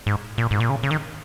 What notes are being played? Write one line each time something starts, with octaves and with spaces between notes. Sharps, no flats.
G#2
A#2
G#2
A#2
C#3
C#3
D#3